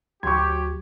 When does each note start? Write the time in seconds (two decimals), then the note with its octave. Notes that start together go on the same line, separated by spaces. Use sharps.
0.23 D2 F#3 G4 C6 C#6 G#6